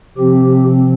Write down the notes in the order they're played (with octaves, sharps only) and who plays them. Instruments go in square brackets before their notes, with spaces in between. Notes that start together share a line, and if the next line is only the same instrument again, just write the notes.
[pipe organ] C3 F3 C4 G4